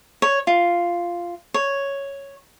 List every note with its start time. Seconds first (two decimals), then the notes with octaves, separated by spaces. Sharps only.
0.22 C#5
0.47 F4
1.54 C#5